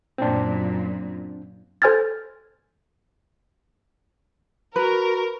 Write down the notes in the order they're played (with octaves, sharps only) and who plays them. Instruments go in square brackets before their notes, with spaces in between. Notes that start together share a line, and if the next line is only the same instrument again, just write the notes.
[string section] F#2 A#2 [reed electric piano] C4 D4
[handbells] A4 C5 G#5 F6 G#6 A6
[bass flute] F#4 [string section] A#4 [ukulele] B4